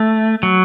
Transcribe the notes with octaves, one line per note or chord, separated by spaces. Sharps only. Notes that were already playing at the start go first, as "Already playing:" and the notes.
Already playing: A3
F#3